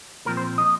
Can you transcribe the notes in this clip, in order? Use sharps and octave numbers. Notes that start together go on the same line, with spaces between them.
A#2 F3 C4 A#4
C5
D#5